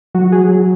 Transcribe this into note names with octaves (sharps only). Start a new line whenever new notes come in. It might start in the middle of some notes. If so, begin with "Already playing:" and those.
F#3 F#4
G#4
F#3